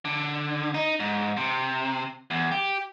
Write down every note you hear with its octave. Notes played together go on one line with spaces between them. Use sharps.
D3
D#4
G#2
C3
E2
G4